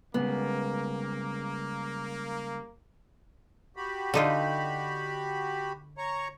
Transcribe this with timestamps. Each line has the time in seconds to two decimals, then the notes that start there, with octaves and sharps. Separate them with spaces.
0.14 C#3 G3 G#3 A#3 B3
3.76 F#4 G4 B5
4.14 D3 D#4 F4
5.98 C#5 A#5 C#6